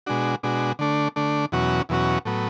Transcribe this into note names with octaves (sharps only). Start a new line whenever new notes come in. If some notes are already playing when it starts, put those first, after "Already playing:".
B2 G#3 D4 F#4
B2 G#3 D4 F#4
D3 A3 D4
D3 A3 D4
E2 B2 F#3 C#4 F#4
E2 B2 F#3 C#4 F#4
A2 F#3 B3